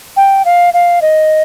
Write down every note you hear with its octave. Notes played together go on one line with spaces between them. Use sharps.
G5
F5
F5
D#5